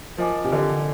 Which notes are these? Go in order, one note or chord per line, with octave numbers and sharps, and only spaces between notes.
F3 A#4 D#5 G#5 D6
C3
D3